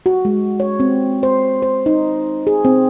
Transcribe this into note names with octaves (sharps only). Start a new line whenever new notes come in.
F#4
G#3
C#5
C4
C5
C5
D#4
G#4
C4